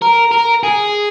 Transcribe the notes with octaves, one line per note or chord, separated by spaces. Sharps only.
A#4
A#4
G#4